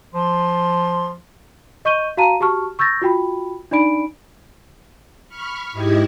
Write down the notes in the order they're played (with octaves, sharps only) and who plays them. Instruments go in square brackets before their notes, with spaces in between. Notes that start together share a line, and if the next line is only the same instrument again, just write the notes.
[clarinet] F3 [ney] C6
[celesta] D#5 C#6 G6 D#7 G7
F#4 F5 A5 A#5 D#7
F#4 G4 A5 C#6 F6
C#6 E6 G6 A6 A#6
F4 F#4 G5 B5
D4 D#4 D5 B5 D7
[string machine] B5 C#6 F6
G#2 E4 G4 D#5 G#6